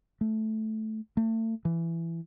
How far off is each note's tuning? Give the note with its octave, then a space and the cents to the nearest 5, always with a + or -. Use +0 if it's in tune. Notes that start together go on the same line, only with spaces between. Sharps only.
A3 -10
A3 +35
E3 +15